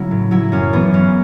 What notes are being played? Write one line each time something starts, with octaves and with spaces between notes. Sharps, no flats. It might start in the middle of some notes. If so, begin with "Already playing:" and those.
Already playing: C#3 F#3 C#4 E4
A2
F#3 E4
F#2 C#4
C#3 E3 B3
F#2 C#4